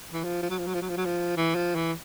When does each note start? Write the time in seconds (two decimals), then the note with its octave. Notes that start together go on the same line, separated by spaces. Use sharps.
0.13 E3
0.24 F3
0.42 F3
0.50 F#3
0.59 F3
0.67 F#3
0.74 F3
0.82 F#3
0.89 F3
0.97 F#3
1.05 F3
1.37 E3
1.55 F3
1.75 E3